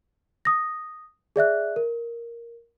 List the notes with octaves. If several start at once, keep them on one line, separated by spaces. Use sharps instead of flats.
D#6 A#6
G#4 D5 E5 F#6
A#4